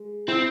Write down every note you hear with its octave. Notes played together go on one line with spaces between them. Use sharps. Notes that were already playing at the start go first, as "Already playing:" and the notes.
Already playing: G#3
C4 E4